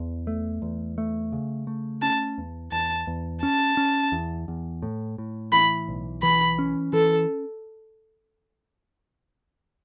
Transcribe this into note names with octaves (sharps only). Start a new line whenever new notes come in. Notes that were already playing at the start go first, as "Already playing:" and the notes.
Already playing: E2
A3
E2
A3
C#3
A3
C#4 A5
E2
E2 A5
E2
C#4 A5
C#4
E2
E2
A2
A2
E3 B5
B1
E3 B5
C#4
E3 A4